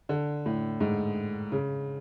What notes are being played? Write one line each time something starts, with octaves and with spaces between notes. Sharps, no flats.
D3
A2
G#2
C#3